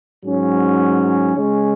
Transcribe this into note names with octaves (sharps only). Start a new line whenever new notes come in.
G#2 F#3 C#4
C#3 G#3 C#4